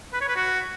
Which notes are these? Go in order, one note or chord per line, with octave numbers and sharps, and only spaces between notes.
B4
C#5
B4
F#4